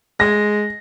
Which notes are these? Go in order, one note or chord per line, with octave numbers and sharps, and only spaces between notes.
G#3 A#6